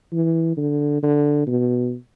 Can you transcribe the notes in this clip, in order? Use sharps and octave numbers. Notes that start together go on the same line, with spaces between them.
E3
D3
D3
B2